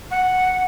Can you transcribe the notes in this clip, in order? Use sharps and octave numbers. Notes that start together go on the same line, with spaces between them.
F#5